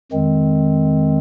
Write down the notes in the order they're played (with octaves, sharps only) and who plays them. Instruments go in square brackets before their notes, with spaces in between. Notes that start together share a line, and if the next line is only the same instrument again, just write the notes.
[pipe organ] F2 D#3 G#3 C4